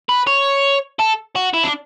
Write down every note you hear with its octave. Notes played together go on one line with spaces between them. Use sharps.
B4
C#5
A4
F#4
E4
D4